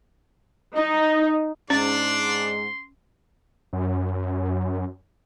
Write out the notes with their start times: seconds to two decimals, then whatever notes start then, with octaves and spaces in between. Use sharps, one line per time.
0.76 D#4 D#5
1.70 G#2 C#4 D4 D5 C6
3.73 F#2